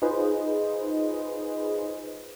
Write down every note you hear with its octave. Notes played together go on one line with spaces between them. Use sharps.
D#4 F4 G#4 B4 C5 D#5